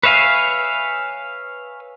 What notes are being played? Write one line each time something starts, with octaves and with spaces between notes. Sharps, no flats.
B4 C#5 E5 F5 G#5